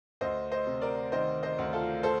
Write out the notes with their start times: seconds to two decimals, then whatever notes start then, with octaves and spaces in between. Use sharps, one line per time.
0.21 D2 C5 D#5
0.52 C5 D#5
0.67 C3
0.81 A#4 D5
1.12 D#3 C5 D#5
1.43 C5 D#5
1.59 D2
1.73 F4 A4
2.03 A4 C5